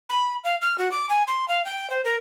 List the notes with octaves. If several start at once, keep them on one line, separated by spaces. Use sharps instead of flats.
B5
F5
F6
F#4
D6
G#5
C6
F5
G5
C5
A#4